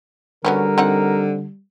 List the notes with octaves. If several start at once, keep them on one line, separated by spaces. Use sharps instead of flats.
D3 F#3 G3 B3 C#4 A#4
C4 D#4 F#5